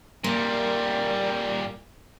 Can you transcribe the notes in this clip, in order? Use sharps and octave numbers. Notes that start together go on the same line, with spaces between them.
A#2 G3 A#3